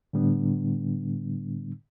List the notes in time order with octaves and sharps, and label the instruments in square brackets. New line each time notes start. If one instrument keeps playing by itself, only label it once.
[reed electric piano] A2 D3 G3 B3 D4